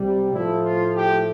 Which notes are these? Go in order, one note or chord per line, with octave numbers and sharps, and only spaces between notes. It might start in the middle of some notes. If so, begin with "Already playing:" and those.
Already playing: C2 C3 G3
A2 F3 A3 E4
F4
G4